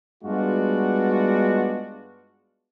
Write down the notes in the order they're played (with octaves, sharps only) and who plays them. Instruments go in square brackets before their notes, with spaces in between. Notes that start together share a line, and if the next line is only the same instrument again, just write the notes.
[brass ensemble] G2 G#3 B3 D4 F4 F#4